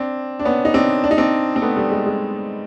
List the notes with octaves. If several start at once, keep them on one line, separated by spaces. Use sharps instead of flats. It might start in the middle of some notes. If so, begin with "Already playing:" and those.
Already playing: C4 D4
D4
B3 C#4
D#4
C4 D4
D4
D#4
C4 D4
C4
A3 B3
G3 A3
G#3
G#3